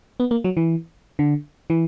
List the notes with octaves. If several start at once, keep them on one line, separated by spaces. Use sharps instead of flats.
B3
A#3
F#3
E3
D3
E3